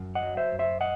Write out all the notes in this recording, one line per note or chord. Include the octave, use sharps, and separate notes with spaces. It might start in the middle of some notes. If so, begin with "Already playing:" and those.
Already playing: F#2
D#5 F#5
F#3
C5 E5
F#2
C5 E5
D#5 F#5